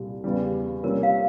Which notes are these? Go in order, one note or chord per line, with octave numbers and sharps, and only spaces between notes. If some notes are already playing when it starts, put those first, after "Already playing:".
Already playing: C2 A#2 G3
E2 C#3 G3
C3 G3 A#3 C#4 F4 A#4
F5